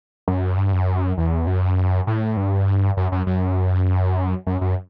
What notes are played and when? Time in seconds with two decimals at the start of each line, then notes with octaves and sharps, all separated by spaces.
0.28 F#2
0.57 G2
0.72 F#2
1.17 E2
1.47 F#2
2.07 A2
2.37 G2
2.97 F#2
3.12 F#2
3.27 F#2
4.47 F#2
4.61 F#2